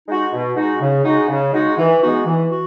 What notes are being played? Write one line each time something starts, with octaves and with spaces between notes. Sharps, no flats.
G#3 D#4 F#4
B2
G#3 D#4 F#4
C#3
G#3 D#4 F#4
C#3
G#3 D#4 F#4
E3
G#3 B3 D#4 F#4
E3
F#4